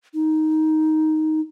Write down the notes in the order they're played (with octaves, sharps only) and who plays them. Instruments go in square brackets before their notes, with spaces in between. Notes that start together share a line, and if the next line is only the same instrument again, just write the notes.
[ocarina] D#4